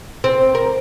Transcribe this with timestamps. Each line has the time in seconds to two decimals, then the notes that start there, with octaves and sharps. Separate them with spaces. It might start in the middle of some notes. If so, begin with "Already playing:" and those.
0.24 C4
0.55 A#4